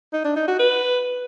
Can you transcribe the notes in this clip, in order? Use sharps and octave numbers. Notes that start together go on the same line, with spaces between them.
D#4
D4
D#4
F#4
B4